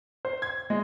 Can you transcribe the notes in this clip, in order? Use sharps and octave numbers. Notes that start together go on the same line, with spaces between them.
C5
G#6
G#3